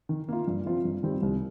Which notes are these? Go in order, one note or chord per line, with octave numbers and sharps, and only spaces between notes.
D#3
A#3 F4
G2
F3 C4 F4
G2
D#3 G3 C4 G4
C2